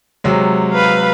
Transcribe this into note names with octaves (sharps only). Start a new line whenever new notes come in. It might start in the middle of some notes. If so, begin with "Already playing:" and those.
C3 F#3 G#3
B4 F5